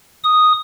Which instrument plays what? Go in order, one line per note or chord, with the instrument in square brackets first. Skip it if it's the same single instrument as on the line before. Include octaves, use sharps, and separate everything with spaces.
[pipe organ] D#6